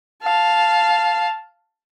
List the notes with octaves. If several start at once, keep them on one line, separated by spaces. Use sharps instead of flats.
F5 A5